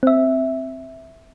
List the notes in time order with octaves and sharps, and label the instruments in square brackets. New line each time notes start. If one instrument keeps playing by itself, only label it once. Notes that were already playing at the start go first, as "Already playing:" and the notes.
[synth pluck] C4 E5